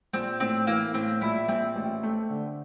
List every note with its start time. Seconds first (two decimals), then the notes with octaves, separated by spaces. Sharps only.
0.13 A#1 C4
0.40 A2 C4
0.67 E3 A#3
0.94 A2 C4
1.21 A#1 E4
1.48 A#1 C4
1.76 A1
2.03 A3
2.30 D3